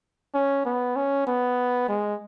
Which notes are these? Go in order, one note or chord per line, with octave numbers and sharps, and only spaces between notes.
C#4
B3
C#4
B3
G#3